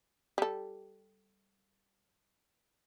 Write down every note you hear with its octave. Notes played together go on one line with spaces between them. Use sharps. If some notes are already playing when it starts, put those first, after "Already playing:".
G3 A4